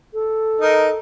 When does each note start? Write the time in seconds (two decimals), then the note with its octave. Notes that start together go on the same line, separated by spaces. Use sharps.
0.14 A4
0.61 D#4 A#4